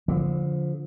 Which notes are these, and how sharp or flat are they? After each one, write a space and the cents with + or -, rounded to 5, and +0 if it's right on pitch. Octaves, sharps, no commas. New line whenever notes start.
D3 -35 F3 +0